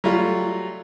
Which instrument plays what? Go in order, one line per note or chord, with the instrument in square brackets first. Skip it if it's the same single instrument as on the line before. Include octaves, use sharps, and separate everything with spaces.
[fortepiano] F#3 G3 A3 F4